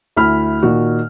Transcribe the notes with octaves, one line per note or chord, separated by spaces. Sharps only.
D2 E4 B5 F6
A#2 D#3 F#4